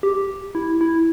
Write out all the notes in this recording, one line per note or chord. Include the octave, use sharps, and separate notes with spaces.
G4
E4
E4